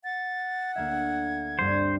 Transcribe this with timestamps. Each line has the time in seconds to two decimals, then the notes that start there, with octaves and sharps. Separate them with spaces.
0.04 F#5 A6
0.76 D2 A#3 E5 G#6
1.59 G2 G3 C4 C5